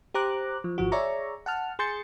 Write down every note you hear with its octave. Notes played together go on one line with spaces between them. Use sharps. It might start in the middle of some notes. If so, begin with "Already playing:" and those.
G4 C5 A#5 D6 F#6
F3
G#1 F3 F#4
G#4 C#5 D5 E5 A#5 C#6
F#5 A5 F6
G#4 C6 G6 A6 C#7